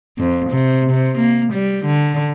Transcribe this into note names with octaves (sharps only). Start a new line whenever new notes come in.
F2
C3
C3
A#3
G3
D3